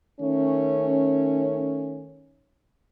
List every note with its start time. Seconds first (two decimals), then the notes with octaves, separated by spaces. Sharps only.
0.21 D#3 A3 C#4